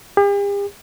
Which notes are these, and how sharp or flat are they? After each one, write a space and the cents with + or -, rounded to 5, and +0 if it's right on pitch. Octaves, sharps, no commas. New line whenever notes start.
G4 +45